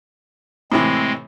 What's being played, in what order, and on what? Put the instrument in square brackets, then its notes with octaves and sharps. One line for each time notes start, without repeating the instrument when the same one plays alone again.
[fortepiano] A2 C3 E3 [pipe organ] G#3 C4